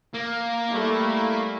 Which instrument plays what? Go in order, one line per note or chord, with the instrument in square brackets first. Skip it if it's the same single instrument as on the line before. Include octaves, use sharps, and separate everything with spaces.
[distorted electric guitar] A#3
[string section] G3 A3 E4